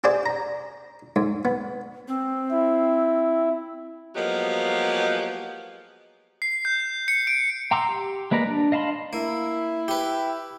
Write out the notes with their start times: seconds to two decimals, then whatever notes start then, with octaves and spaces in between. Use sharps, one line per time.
0.04 G4 G#4 C5 D5
0.26 A#5
1.16 G#2
1.45 B3
2.08 C4
2.51 E4
4.15 F3 F#3 G#3 A#3 B3 G4
6.42 C7
6.65 G6
7.08 C#7
7.27 D7
7.71 G5 A#5 C6 D6 E6
7.89 G4
8.31 G#3 A#3 B4 D5 A#5
8.47 D4
8.72 D#5 F5 A5 B5 C6
9.13 A#3 E4
9.88 G4 B4 G5